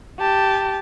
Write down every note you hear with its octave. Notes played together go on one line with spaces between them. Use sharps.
G4 A5